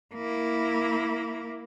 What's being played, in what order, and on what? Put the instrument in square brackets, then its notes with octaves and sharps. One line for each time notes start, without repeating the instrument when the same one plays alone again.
[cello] A#3 E4